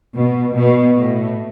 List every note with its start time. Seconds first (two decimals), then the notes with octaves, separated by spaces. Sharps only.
0.15 B2
0.55 B2
0.97 A2